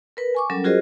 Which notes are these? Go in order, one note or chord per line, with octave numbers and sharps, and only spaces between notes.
A#4 B4
G#5 C#6 D6
F#3 G3 C#4 A4 A#4
F4 F#4 G#4 A#4 C5 D#5